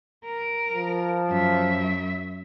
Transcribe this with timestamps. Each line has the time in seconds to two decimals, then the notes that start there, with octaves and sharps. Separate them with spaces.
0.25 A#4
0.73 F3
1.28 F#2 E5